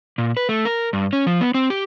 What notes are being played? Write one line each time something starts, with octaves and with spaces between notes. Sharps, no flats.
A#2
B4
A3
A#4
G2
C#4
F3
B3
C4
G4